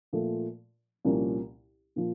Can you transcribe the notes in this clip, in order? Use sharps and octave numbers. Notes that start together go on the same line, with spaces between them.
A#2 F3 A3
C2 A#2 F3 A#3 C#4
A#2 F3